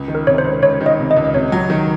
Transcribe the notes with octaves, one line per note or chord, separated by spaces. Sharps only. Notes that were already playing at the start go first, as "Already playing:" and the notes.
Already playing: C#2
D#3
A#4
C3 C#5
C5
C#2
C#2 C#5
D#3
D#5
C3
D#5
C#2
D#5
C3 C#5
F#3
D#3